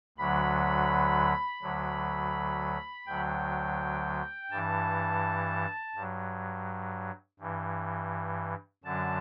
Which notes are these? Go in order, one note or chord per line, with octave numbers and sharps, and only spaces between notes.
D2 D3 F#3 B5
D2 D3 F#3
D2 D3 F#3 G5
G2 E3 A5
G2 F#3
G2 E3
F#2 D3 F#3 A5